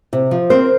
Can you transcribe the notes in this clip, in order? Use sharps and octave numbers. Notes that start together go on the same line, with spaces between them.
C3
F3
C4 A#4 C5